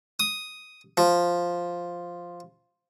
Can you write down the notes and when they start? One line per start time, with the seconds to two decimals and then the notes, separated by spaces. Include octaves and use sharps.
0.20 D#6
0.97 F3